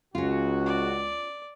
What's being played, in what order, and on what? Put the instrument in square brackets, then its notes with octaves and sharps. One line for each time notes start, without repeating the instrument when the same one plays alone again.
[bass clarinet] C#2 [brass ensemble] C#3 F#4 [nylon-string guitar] C#4 F4
[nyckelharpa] D5